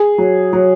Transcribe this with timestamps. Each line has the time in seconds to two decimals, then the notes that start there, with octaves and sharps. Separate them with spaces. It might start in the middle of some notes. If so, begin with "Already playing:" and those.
Already playing: G#4
0.18 F#3
0.53 F#3